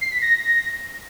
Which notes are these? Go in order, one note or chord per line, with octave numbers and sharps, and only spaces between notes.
C7
B6
A#6